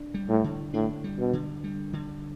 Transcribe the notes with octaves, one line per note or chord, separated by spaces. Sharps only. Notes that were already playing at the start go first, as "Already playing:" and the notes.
Already playing: D4
G3
A2
D3
A2 D4
G3
B2
D3
G3
D3